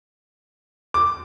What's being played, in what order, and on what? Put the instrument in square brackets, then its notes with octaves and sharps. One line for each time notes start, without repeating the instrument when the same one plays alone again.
[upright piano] D6